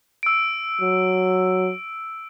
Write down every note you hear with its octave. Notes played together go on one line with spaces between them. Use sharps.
E6 D7
F#3